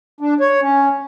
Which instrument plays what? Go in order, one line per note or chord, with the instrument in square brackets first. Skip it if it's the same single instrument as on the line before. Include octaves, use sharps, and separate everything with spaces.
[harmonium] D4
C#5
C#4